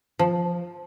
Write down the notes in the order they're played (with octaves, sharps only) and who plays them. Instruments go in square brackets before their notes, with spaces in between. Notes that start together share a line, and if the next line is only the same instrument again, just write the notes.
[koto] F3